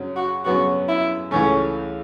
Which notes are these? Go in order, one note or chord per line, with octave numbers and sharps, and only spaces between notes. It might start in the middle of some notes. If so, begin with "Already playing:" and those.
Already playing: F#2 C#3 F#3
F#4
F#2 C#3 F#3 B3 F#4
E4
C#2 C#3 E3 A3 C#4